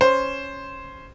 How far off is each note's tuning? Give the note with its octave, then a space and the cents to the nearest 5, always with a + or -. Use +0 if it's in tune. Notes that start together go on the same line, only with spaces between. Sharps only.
C#4 +0 C5 +0